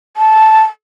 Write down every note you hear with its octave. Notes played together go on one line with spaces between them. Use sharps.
A5